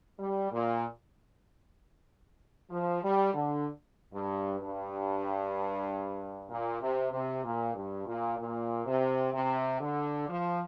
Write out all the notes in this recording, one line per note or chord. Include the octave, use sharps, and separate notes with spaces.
G3
A#2
F3
G3
D3
G2
G2
A#2
C3
C3
A#2
G2
A#2
A#2
C3
C3
D3
F3